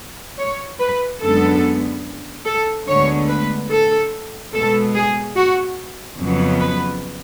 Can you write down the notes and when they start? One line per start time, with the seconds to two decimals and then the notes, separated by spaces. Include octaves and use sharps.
0.38 C#5
0.79 B4
1.21 F#2 D3 G#3 B3 A4
2.45 A4
2.87 D2 D3 G#3 B3 C#5
3.29 B4
3.70 A4
4.53 B2 G#3 B3 A4
4.95 G#4
5.36 F#4
6.19 F2 C#3 F#3 B3
6.60 B4